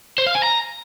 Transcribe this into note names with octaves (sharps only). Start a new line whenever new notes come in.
C5
F5
G#5
A#5